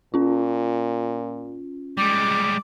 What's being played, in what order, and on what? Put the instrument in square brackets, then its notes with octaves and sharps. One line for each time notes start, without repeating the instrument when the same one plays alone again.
[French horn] A#2 [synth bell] C#4 F4
[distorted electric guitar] G3 G#3 [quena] D6